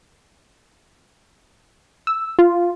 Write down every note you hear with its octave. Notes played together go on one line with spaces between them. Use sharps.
E6
F4